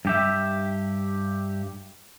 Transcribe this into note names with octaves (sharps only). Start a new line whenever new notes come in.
G2 G4 E5